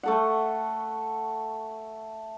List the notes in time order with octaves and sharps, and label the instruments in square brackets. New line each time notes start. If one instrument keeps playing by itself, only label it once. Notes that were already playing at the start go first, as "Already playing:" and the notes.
[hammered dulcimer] A3 A4 F#5